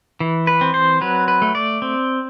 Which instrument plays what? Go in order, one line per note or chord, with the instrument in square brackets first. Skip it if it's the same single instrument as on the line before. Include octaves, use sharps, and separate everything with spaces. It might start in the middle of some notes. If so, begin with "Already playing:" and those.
[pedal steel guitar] E3
B4
C4
C5
F#3 B4
B4
A3
D5
C4